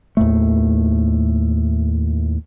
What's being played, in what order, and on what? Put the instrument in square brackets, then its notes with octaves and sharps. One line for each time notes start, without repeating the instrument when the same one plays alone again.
[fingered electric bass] D#2 A2 A3